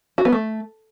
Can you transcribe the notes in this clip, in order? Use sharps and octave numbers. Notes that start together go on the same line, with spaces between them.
F#4
B3
A3